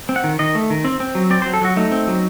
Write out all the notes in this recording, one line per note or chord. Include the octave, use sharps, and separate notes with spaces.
C4
F#5
D#3
D#3 D#5
A3
D#3
C4
C4
F#3
C4 D5
C5
F#3
A4
F#3 F#4
A3 D#4
C4
F#3